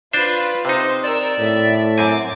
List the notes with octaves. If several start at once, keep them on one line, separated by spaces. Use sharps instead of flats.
D4 F4 B4 C5
C3 D#4 C5
A#4 D5 E6
A2 E5
F#2 C4 G#5 D6